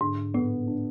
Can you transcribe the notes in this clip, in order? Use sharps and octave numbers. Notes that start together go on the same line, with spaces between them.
G#2 D3
A2 B3
D4